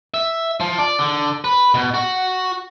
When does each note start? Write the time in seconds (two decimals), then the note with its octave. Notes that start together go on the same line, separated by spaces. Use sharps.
0.14 E5
0.60 F3
0.78 D5
0.99 D3
1.44 B4
1.74 B2
1.94 F#4